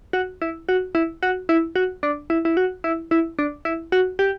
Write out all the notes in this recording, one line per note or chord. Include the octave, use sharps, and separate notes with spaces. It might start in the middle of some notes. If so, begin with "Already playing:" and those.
F#4
E4
F#4
E4
F#4
E4
F#4
D4
E4
E4
F#4
E4
E4
D4
E4
F#4
G4